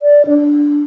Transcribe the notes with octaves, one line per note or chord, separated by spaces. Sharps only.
D5
D4